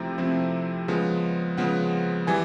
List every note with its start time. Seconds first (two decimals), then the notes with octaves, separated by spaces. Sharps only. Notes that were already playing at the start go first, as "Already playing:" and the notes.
Already playing: C3 F3 A3 C4 E4 G5 A#5
0.18 C3 F3 A3 C4 E4
0.88 C#3 F3 G#3 B3
1.57 C#3 F3 G#3 B3 F#5
2.27 E3 G3 G#5